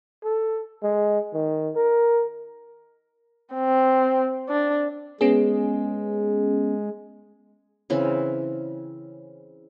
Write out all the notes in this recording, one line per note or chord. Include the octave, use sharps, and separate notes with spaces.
A4
G#3
D#3
A#4
C4
D4
G#3 B3 C#4 G#4
C#3 E3 C4